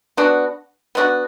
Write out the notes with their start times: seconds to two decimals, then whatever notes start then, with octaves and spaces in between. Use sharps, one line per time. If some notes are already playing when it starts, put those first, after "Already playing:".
0.17 B3 D4 F#4
0.95 B3 D4 F#4